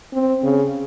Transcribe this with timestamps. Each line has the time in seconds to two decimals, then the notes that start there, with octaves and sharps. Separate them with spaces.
0.13 C4
0.43 C#3